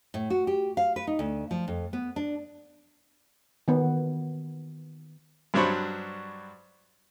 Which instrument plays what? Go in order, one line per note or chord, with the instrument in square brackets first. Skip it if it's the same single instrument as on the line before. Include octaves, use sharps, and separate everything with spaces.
[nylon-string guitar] A2
F#4
G4
F5
B4
D#4
D2
F3
F2
B3
D4
[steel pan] D#3 B3
[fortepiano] G2 F#3 D4 C5 B5 C#6